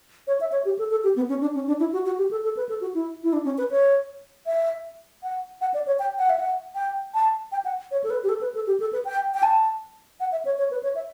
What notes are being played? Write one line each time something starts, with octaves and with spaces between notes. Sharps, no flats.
C#5
E5
C#5
G4
A4
A4
G4
B3
C#4
D4
C#4
D4
E4
F#4
F#4
G4
A4
A4
B4
A4
F#4
E4
E4
D4
C#4
B4
C#5
E5
F#5
F#5
D5
C#5
G5
F#5
E5
F#5
G5
A5
G5
F#5
C#5
A4
B4
G4
A4
B4
A4
G4
A4
B4
G5
G5
A5
F#5
E5
C#5
C#5
B4
C#5
E5